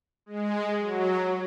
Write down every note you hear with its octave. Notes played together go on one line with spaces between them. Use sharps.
G#3
F#3